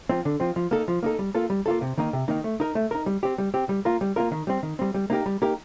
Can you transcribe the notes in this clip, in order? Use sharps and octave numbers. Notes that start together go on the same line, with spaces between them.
F3 C4
D3
F3 C4
F3
A#3 D#4 A4
F3
A#3 D#4 A4
G3
A#3 F4 A4
G3
A#3 F4 A4
C3
D#3 A#3 D#4
C3
D#3 A#3 D#4
A3
D#4 A#4
A3
D#4 A#4
G3
C4 G4
G3
C4 G4
G3
A#3 F4 A#4
G3
A#3 F4 A#4
D#3
G3 C4
D#3
G3 C4
G3
A#3 D#4 G4 A#4
G3
A#3 D#4 G4 A#4